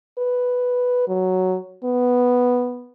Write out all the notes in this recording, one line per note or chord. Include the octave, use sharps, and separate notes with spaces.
B4
F#3
B3